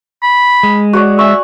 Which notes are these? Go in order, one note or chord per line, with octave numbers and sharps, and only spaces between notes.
B5
G#3
F#4 C#5 D5
E5 F#5 G#5 C#6